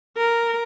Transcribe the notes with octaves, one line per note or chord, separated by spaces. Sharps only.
A#4